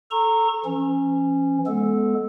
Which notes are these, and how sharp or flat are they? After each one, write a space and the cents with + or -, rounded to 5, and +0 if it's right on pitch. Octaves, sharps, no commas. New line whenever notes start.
A4 +0 A#5 -15 C#6 -35
F3 -45 C#4 -15
G#3 +10 B3 -15 A4 -10